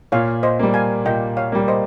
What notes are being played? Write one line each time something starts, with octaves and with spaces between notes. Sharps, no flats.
A#2 C#5 F5
C5 D#5
G3 A#3
F5 G#5
A#2 D#5 G5
C#5 F5
G3 A#3
C5 D#5